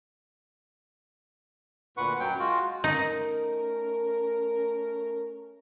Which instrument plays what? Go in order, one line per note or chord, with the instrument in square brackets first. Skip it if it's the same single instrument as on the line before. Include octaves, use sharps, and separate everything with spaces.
[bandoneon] D2 A#2 B4 F#5 C#6
F#2 F#3 G5
G#3 F4 F#4
[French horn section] A3 C#4 A#4 [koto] D#4